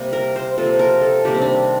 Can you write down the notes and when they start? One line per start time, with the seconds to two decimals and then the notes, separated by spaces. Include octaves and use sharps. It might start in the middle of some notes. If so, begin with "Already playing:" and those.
Already playing: C3 G3 A#3
0.13 A#4
0.36 C5
0.58 C3 F3 A#3 A4
0.79 A#4
1.01 A4
1.25 C3 D#3 G3 A#3 G4
1.35 C4
1.42 D4